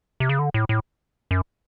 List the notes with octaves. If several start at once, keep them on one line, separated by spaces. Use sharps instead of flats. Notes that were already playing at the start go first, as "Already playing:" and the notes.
C3
C#3
D3
A2
A2
F#2